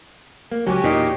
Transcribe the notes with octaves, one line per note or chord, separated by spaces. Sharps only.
A#3
C#2 F#3 C#4 F#4 G4 G#5
E2 A#2 D#4